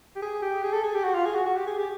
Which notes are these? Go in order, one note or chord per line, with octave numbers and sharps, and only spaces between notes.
G4
G#4
G4
G#4
A4
G#4
G4
F#4
F4
G#4
F#4
F#4
G4
G#4
G4